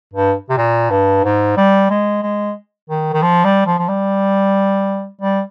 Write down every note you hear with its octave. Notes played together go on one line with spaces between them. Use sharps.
G2
C3
A#2
G2
G#2
G3
G#3
G#3
D#3
D#3
F3
G3
F3
F3
G3
G3